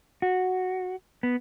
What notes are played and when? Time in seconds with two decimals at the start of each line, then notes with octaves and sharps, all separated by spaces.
0.22 F#4
1.23 B3